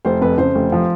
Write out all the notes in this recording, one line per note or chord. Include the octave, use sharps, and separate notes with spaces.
F1 C5
F2 B4
C#3 C5
F1
F3